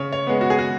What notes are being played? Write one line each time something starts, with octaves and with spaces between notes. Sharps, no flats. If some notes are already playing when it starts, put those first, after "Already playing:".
Already playing: C#3 C#5
C#5
G#3 B3
F#4
G#4
F#4